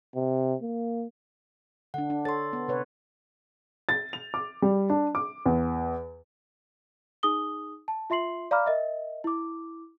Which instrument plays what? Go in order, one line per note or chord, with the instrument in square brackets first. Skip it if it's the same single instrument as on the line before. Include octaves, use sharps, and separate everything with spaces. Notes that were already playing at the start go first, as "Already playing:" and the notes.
[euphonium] C3
A#3
[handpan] D3 D4 [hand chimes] F#5
[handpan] D4
[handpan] A4 C#5 [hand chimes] C6 A6
[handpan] B3
C3 B4 C#5
[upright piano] A6
F7
D6
G3
D4
D6
E2
[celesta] D#4 G#4 D#6 G7
A5
F4 E5 C6 C7 F#7
D5 F5 A#5 B5 D6 F6
A#4 D#5 E5
E4 D6